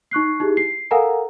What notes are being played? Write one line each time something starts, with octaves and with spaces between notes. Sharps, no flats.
D#4 C#6 F#6 C7
D#4 E4 G4 G#4
C7
A4 A#4 F5 F#5 G#5 A#5